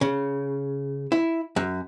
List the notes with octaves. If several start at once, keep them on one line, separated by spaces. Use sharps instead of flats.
C#3
E4
F#2